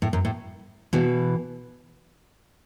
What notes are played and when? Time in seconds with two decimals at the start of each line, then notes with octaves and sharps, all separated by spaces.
0.02 A2
0.13 F#2
0.25 A2
0.93 B2 E3